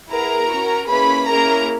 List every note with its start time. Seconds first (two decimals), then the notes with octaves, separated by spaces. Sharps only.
0.11 B3 E4 G#4 A#4 A#5
0.49 C#4 F#4
0.88 A#3 C#4 E4 G#4 B4 B5
1.28 A#3 C#4 E4 G#4 A#4 A#5